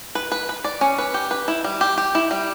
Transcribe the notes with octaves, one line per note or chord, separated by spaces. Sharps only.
B4
B4
B4
D5
C#4
B4
G4
B4
E4
G3
G4
G4
E4
G3